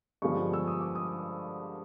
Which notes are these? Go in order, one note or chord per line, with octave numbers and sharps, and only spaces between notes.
G2 D3 F3 G#3 B3 C#6
E6
D#6
D6
D#6